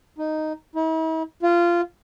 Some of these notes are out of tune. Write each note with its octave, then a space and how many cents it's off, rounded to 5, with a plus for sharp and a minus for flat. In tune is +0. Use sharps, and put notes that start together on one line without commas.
D#4 -5
E4 -45
F4 -15